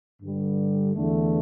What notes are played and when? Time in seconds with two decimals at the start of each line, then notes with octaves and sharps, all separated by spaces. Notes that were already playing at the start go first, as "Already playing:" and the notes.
0.22 G2 D3 G3
0.94 E2 D3 A3